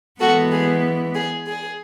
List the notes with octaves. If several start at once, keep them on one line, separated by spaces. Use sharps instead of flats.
E3 G#3 B3 F#4 A4
G#4
G#4
G#4